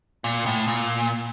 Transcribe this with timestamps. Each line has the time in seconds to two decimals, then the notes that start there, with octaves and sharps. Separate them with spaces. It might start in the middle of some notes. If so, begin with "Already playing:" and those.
0.24 A#2
0.46 A2
0.68 A#2